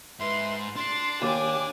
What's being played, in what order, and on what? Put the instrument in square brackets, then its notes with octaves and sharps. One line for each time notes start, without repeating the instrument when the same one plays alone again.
[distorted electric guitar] G#2 [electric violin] B4 C6 [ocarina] E5
[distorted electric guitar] D4 [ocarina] C6 [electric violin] A6 C7
[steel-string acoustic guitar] D#2 [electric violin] G4 G#5 [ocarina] D6